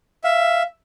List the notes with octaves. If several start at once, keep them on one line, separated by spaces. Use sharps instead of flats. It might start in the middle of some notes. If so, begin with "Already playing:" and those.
E5 F5